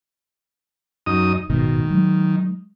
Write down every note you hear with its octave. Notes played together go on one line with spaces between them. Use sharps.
F#2 D#4 D#6
A1 G#2 B2 D#3
F#3 G#3